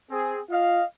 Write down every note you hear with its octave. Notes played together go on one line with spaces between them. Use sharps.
C4 G#4
F4 D#5 F5